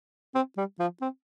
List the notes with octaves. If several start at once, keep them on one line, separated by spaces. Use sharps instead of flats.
C4
G3
F3
C4